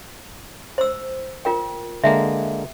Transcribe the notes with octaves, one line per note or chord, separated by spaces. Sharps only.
C5 E6
F4 A#4 G5
D3 G#3 A#3 E5